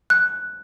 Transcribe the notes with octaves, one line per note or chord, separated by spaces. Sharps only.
F#6